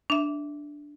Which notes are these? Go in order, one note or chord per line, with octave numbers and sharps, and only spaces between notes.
D4 E5